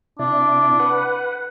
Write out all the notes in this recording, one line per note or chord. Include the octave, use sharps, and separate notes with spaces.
C3 D4 E4 D5
B4 F#5